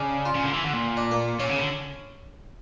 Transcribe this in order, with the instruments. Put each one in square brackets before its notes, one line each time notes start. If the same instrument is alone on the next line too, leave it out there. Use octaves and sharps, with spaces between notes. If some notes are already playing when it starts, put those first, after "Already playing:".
Already playing: [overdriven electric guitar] C#3 [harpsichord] D4
[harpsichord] F4
[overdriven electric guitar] C#3
D3
E3
D3
A#2
[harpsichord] D4
A#3
[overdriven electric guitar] A#2 [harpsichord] C#4
[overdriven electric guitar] C#3
D3